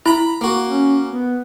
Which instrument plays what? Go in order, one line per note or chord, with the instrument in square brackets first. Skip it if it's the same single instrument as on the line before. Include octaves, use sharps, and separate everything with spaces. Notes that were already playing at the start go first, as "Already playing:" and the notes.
[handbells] E4 [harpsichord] A#5 B5
[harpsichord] A#3 F#4
[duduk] C#4
B3